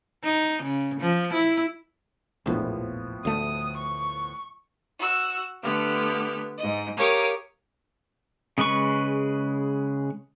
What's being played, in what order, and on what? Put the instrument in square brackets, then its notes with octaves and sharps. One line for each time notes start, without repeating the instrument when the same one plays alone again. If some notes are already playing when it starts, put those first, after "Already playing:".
[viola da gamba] D#4
C#3
F3
E4
[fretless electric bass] E1 A#1 [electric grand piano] A2 F3 B3
[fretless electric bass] D2 A3 [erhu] D#6
[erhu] C#6
[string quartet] F#4 E6
D3 A3 B3 G4 F6
G#2 D#5
G4 A#4 C#5 F5 D#6
[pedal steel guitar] C#3 G#3 B4 C#6